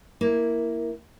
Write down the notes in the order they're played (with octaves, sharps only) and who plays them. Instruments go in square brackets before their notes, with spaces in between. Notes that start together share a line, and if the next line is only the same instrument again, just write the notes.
[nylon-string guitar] A#3 E4